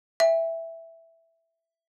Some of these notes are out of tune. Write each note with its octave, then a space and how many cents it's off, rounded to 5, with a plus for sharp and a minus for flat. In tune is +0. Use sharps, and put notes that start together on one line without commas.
E5 +0 G5 +35